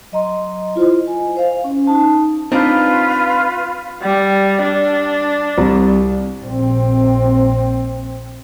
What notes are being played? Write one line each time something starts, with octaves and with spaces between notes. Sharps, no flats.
F#3 D#5 A#5 C6
E4 F4 C5 D#5
G#5
C5 F5
C#4
D#4 A5
C4 D4 D#4 F4 B4
G3
D4
C2
A#1 C4